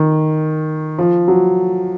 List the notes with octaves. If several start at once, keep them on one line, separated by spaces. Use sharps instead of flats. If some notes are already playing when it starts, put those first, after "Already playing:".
Already playing: D#3
F3
F#3